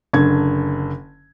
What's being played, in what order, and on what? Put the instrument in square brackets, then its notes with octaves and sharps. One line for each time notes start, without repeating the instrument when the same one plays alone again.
[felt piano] F#1 D3 G#6